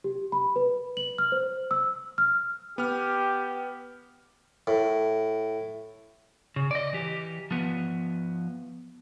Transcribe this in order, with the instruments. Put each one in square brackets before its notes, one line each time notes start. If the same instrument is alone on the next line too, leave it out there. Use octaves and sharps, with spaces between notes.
[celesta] G4
B5
B4
F#7
F6
C5
E6
F6
[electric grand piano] B3 F6 [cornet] G4
[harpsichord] A2
[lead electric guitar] C#3
D5 D#5
E3 G4
F3 B3